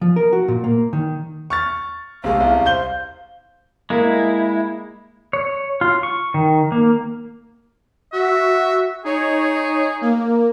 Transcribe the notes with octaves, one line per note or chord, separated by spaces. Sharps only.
F3
A#4
F#4
A#2
A#3
D#3
C#6 F6 A6
B1 C3 G#3 F5
C2
C5 G6 G7
G#3 A#3 E4
C#5
F4
C#6
D#3
A#3
F#4 E5
D#4 G#4 C#5
A#3